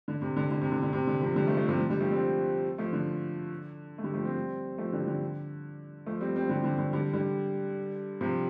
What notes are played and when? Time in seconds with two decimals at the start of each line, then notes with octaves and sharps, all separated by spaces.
0.08 D3
0.22 C3
0.36 D3
0.51 D3
0.62 C3
0.72 D3
0.82 D3
0.93 C3
1.07 D3
1.21 C3 F3
1.36 D3 G3
1.47 F3 A3
1.57 F3 A3
1.68 C3 F3
1.79 D3
1.89 D3 G3
2.00 F3 A3
2.11 G3 C4
2.78 F3 A3
2.93 D3
3.98 A3
4.03 D3 G3
4.14 F3 A3
4.25 G3 C4
4.78 F3 A3
4.93 D3 G3
5.07 D3
6.06 F3 A3
6.21 G3 C4
6.35 G3 C4
6.49 D3 G3
6.64 D3
6.78 D3
6.92 D3 G3
7.13 D3 G3
8.21 C3 F3